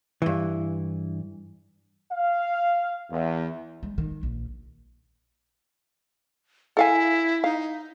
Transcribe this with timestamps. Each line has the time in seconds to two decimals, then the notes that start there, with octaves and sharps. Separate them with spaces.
0.22 G2 E3
2.12 F5
3.11 E2
3.83 G#3
3.98 D#3
4.23 A#1
6.77 E4 A4 F5 G#5
7.44 D#4 F5